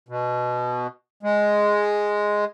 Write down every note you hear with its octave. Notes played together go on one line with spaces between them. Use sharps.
B2
G#3